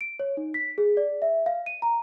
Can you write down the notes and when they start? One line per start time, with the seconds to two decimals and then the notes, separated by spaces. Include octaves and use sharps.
0.01 D7
0.19 C#5
0.37 D#4
0.54 B6
0.78 G#4
0.97 D5
1.22 E5
1.46 F5
1.66 D#7
1.82 A#5